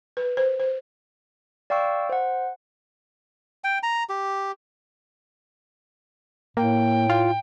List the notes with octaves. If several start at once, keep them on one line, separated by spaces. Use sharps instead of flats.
B4
C5
C5
D5 F5 G5 C#6 E6
C5 F#5
G5
A#5
G4
A2 A#3 G5
F4